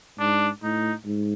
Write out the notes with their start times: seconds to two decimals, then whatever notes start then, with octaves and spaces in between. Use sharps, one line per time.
0.19 G#2 D4
0.63 A2 D#4
1.05 G#2